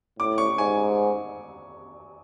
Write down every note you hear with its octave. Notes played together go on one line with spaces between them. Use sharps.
A2 D6
C#6
G#2 G#5